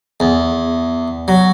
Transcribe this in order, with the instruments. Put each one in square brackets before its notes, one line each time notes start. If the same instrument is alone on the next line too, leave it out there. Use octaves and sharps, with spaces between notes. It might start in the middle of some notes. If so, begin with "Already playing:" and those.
[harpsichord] E2
F#3